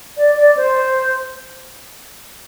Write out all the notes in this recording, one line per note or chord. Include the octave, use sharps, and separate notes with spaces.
D5
D5
C5